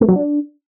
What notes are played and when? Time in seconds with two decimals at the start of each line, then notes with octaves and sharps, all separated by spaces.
0.01 A3
0.08 F#3
0.16 D4